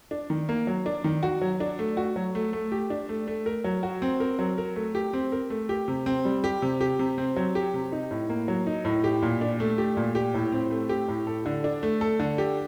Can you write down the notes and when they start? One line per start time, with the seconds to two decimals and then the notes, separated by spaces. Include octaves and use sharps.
0.11 D4
0.30 D#3
0.49 A#3
0.67 F#3
0.86 D4
1.04 D#3
1.23 F#4
1.41 F#3
1.60 D4
1.79 A3
1.97 F#4
2.16 F#3
2.35 A3
2.53 A3
2.72 G4
2.90 D4
3.09 A3
3.28 A3
3.46 A#4
3.64 F#3
3.83 F#4
4.02 C4
4.20 A#4
4.39 F#3
4.58 A#4
4.76 A3
4.95 G4
5.13 C4
5.32 A#4
5.50 A3
5.69 G4
5.88 C3
6.06 C4
6.25 G3
6.44 G4
6.62 C3
6.81 G4
6.99 C3
7.18 C4
7.36 F#3
7.55 G4
7.74 C3
7.92 D#4
8.11 A2
8.29 A#3
8.48 F#3
8.67 D#4
8.85 A2
9.04 G4
9.22 A#2
9.41 D4
9.60 A3
9.78 G4
9.97 A#2
10.15 G4
10.34 A2
10.52 C4
10.71 A3
10.89 G4
11.08 A2
11.27 A4
11.46 D3
11.64 D4
11.83 A3
12.01 A4
12.19 D3
12.38 G4